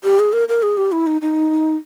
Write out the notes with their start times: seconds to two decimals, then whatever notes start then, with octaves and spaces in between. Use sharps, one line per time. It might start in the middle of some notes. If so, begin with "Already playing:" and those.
0.04 G4
0.19 G#4
0.33 A#4
0.49 A#4
0.63 G#4
0.77 G4
0.92 E4
1.07 D#4
1.22 D#4